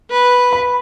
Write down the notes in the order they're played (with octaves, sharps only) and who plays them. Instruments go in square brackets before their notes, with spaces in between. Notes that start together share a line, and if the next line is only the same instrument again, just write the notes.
[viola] B4
[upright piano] B5